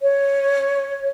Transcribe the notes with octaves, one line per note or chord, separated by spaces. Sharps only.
C#5